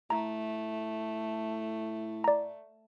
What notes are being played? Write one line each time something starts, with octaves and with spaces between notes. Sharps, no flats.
A2 A3 A#5
D5 A#5